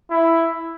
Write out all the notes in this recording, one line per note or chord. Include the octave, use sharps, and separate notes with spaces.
E4